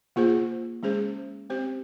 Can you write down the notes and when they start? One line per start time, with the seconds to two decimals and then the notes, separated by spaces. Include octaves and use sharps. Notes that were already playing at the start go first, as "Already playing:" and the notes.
0.16 A#3 F4 G#4 C5
0.83 G#3 C#4 G#4 C5
1.50 C4 G4 C5